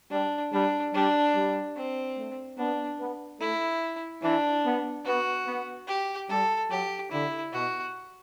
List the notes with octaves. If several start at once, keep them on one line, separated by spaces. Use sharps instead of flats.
G3 D4
G3 D4
G3 D4
G3
C4
A3
B3 D4
B3
A3 E4
E3 D4
B3
B3 F#4
B3
G4
G3 A4
F#3 G4
D3 E4
B2 F#4